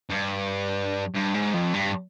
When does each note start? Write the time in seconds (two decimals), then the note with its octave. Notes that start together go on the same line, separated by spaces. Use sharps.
0.11 G2
1.15 G2
1.34 G#2
1.54 F2
1.73 G2